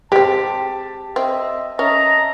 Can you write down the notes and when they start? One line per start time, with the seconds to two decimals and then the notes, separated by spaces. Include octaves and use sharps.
0.12 G#3 C4 G4 A5
1.16 C4 D#5 E5
1.79 C#4 D#5 E5 A5 A#5